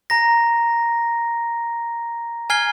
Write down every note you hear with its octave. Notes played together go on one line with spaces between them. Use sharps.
A#5 A#6
G#5 F6 G#6 C7 G7